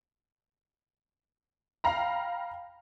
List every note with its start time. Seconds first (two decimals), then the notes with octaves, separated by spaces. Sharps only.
1.84 F5 G5 A#5 B5